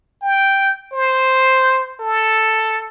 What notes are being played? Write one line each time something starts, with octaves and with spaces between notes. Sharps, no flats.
G5
C5
A4